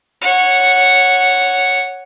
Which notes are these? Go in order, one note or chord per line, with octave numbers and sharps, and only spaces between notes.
C#5 F#5